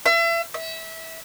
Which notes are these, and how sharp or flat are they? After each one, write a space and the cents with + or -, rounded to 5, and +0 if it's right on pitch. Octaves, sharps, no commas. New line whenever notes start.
E5 +35
E5 -20